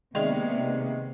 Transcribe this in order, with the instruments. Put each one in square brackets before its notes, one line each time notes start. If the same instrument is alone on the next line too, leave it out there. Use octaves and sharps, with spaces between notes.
[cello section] C3 A#3 B3 [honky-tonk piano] D#3 G#3 F7 [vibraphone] D5 E5